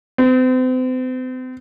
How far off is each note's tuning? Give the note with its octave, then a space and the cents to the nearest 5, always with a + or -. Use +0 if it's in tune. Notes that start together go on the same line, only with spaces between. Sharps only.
C4 -40